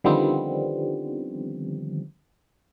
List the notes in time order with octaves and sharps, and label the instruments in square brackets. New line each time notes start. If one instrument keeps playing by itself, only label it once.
[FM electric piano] D3 D#3 F3 G3 B3 C4